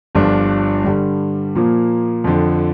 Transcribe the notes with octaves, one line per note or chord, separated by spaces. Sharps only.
G1 G2 F3 D4 F4
G2 D3 G3
A#2 F3 A#3
F2 D3 F3